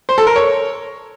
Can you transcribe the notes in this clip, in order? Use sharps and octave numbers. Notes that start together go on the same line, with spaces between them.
C5
A4
A#4
C#5